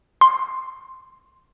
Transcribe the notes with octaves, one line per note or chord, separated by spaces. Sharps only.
C6